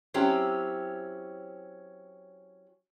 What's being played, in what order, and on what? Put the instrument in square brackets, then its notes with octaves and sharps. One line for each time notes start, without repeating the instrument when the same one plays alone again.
[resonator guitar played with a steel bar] F#3 C4 C#4 E4 G4